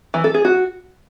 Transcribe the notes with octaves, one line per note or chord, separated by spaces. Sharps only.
E3
A4
G#4
F#4